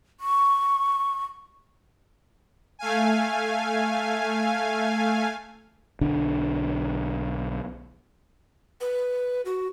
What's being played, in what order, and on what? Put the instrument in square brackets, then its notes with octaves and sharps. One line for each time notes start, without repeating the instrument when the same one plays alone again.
[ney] C#6
[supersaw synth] A3 F5 G#5
[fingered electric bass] B1 D3 D4
[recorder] B4
F#4